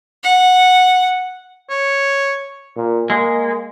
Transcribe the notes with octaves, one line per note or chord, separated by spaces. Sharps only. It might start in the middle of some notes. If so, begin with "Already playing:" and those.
F#5
C#5
A#2
G#3 A#3